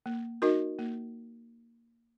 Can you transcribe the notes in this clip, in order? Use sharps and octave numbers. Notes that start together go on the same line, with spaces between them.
A#3
D#4 F#4 A#4 D#5
A#3